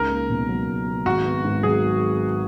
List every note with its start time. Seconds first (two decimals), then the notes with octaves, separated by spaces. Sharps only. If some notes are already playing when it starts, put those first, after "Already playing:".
Already playing: C#2 D#4 A#4
0.10 A#3
0.30 B2
0.48 F#3
0.68 C#2
0.87 A#3
1.06 G#1 F#4
1.25 B3
1.44 G#2
1.63 F#3 G#4